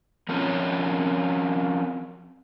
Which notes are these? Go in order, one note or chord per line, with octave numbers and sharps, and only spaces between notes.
F3 C4 C#4 A#4 C#5